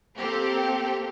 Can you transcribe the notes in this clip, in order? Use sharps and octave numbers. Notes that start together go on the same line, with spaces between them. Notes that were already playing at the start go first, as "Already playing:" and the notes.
A#3 C4 G4 A4